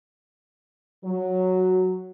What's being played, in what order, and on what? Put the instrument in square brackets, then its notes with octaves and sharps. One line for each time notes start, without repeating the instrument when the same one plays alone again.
[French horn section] F#3